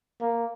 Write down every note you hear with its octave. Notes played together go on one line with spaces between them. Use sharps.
A#3